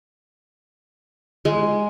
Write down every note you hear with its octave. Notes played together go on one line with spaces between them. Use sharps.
G#3